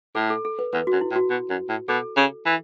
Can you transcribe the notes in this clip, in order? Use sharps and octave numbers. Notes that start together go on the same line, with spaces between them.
A2 A4
A4
A4
B4
E2 B4
F#4
F#2
E4
A2
F#4
B2
F#2
A2
B2 A4
C#3
E3